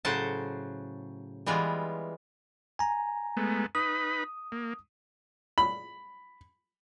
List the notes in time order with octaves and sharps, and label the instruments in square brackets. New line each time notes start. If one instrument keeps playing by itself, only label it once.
[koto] A2 C#3 F#3 F#4 C5 A5
E3 G3 G#3 B3 F4
[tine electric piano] G#5 A#5
[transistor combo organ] G#3 A3 B3
[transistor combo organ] D#4 B4 B5 [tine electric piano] D#6
[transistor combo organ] A#3
[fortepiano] B5